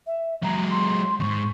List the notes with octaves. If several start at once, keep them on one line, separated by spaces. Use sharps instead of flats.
E5
F#3 G#3 A#5
C6
E2 G#2 C#6